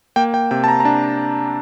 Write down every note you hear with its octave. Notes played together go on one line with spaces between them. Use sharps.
A#3 G5
G5
C3 G5
A5
A#5
A#5
D4 A5